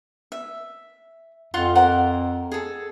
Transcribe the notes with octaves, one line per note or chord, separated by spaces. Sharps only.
E5
F2 F4 F#5 C6
A#4 C5 F#5
G#4 A4